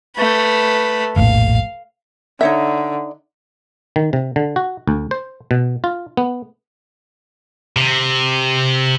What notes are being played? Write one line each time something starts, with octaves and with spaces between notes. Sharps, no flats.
A3 B4
F1 A#1 A2 F5
D3 D#4 C#5 E5
D#3
C3
D3
F#4
D2
C5
B2
F4
B3
C3